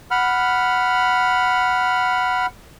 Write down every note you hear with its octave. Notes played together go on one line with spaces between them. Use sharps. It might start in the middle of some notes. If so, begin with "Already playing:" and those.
F#5 B5 F6